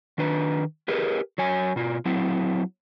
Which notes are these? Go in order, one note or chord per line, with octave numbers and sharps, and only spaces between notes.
D#3 D4 B4
G4 G#4 A#4 B4 D#5
F#3 C#5 G#5
B2 F4
F#3 C4 E4